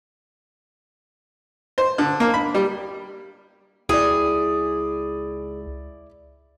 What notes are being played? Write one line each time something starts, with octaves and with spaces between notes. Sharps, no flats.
C5
D3
A#3
B5
G3
C#2 E4 G#4 D5